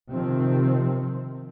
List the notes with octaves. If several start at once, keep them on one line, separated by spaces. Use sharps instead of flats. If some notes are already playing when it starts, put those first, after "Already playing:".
C3 D#3 F3 C4